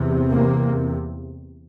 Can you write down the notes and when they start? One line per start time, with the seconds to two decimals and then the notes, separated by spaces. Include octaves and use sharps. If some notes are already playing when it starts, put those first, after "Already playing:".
Already playing: E2 C3
0.30 A#3